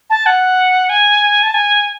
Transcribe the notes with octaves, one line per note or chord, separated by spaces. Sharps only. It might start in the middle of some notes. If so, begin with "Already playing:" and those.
A5
F#5
G#5
A5
G#5